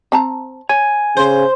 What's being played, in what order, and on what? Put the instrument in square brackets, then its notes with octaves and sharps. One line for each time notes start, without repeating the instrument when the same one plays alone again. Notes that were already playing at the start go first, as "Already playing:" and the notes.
[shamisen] C4 A5 A#5
[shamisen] C#5 [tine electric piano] G#5
[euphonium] C#3 [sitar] C5